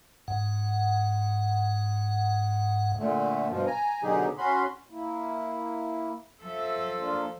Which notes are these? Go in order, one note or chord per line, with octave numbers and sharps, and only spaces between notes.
G#2 F#5
A#2 D3 A3
G2 B2 F3
G#5 A#5
B2 D3 F#3 D#4 G4 G#4
C#4 F#4 B5 C6
A#3 E4
F3 A4 E5
A#3 D4 F4